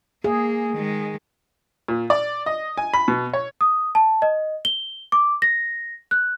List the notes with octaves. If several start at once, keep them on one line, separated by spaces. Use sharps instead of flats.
A#3 G#4
D#3 G#3
A#2
D5
D#5
G#5
B5
B2
C#5
D#6
A5
D#5
G7
D6
A#6
F#6